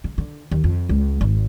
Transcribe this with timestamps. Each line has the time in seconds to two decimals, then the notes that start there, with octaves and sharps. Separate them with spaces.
0.04 C#3
0.18 D3
0.51 D#2
0.64 F2
0.89 C#2
1.21 G#1